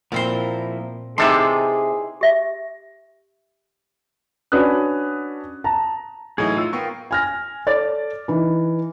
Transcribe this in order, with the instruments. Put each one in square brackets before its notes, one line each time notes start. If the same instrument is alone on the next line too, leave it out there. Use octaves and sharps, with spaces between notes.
[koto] A#2 C4 C5 [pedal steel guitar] F3 A#3 E4
[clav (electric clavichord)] C3 A4 [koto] D#4 E4 B4 [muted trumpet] G#4 [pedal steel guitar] C6 D6
[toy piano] G4 E5
[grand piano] C#4 D4 F#4 B4 D#6 F#6
A5 A#5
[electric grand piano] A2 D#4 [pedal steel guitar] E3 F#3 G#4
[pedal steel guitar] F4 E6
[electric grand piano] B3 C#6 [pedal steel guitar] A#4 F5 G5
[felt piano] G#5 F6 A#6
A4 D5 D6 A6
E3 D#4